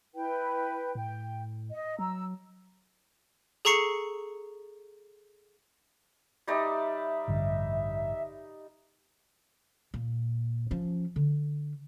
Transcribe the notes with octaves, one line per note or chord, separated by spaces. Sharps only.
E4 B4 G5
A2 G5
D#5
F#3 A#5 E6
G#4 A4 A#5 C#6 C7 C#7
G3 D#4 D5 E5
A1 G2 D3
A#2
F3 C#4
D3